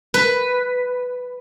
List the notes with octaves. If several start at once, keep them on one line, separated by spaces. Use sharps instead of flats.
B4